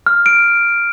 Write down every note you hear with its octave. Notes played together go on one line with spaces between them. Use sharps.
F6
D7